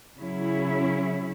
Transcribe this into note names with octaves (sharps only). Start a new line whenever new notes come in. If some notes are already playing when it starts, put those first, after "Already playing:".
C#3 F#3 C#4 E4